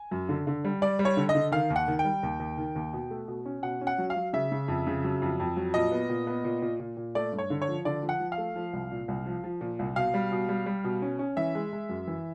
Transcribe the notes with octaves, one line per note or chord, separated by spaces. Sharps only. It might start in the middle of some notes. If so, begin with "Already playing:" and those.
Already playing: G#5
F#2
D3
D3
G3
G3 D5
G3
C#5
D3
D#5
D3
D#3 F5
D#2
F#5
D#3
G5
G3
D#2
D#2
D#3
D#2
B2
A3
B2
C#4
B2 F#5
C#4
F#5
F#3
F5
F#3
C#3 E5
C#3
F2
C#3
F#3
F2
F2
F#3
A#2 D#5
B3
A#2
B3
A#2
A#2
A#2
A#2
A3 D5
G2
C#5
D3
C#5
F3
D3 D5
F3
F#5
F3
F5
A3
F3
C2
A#2
C2
F3
F3
A#2
C2
B2 F5
G3
B2
G3
G3
B2
C#4
C#4
E3 E5
G#3
G#3
F#2
E3